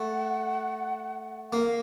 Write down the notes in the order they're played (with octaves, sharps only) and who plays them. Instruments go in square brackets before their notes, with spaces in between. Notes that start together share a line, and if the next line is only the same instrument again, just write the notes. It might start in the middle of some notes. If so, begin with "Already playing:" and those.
Already playing: [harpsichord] A3 [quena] F#5
[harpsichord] A#3 [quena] F5